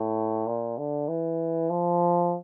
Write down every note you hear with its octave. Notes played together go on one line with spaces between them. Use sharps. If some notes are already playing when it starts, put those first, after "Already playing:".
Already playing: A2
A#2
D3
E3
F3